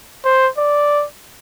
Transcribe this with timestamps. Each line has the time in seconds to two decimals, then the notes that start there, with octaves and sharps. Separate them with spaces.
0.25 C5
0.58 D5